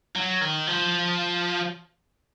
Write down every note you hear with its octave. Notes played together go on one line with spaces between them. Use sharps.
F#3
D#3
F3